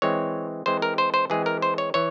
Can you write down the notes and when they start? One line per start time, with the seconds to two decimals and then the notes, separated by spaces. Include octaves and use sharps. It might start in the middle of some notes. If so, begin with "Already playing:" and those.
0.02 E3 G#3 C4 C#5
0.66 E3 G#3 C4 C5
0.82 A#4
0.98 C5
1.14 C5
1.30 E3 G#3 C4 G#4
1.46 A#4
1.62 C5
1.78 C#5
1.94 E3 C#5